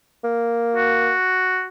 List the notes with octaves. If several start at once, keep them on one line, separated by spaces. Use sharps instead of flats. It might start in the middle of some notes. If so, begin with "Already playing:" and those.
A#3
F#4